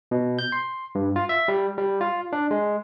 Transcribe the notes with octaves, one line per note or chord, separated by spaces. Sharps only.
B2
G6
C6
G2
F4
E5
G3
G3
F4
D4
G#3